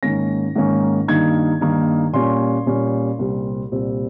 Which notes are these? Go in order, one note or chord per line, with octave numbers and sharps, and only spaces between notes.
G#2 D#3 A#3 C#4 A#6
G#2 D#3 A#3 C#4
G2 D#3 A#3 D#4 G#6
G2 D#3 A#3 D#4
A#2 G3 C#4 C6
A#2 G3 C#4
C2 A#2 G3 C4
C2 A#2 G3 C4